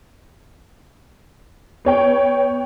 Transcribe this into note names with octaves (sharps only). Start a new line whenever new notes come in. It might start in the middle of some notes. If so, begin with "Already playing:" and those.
B3 C#5 G5